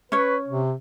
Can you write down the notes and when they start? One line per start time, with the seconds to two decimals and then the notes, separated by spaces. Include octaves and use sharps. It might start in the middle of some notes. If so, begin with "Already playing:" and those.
0.12 C#4 B4 C#5
0.48 C3